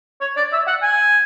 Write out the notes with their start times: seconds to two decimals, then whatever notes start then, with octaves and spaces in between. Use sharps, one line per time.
0.21 C#5
0.37 D5
0.53 E5
0.68 F#5
0.83 G#5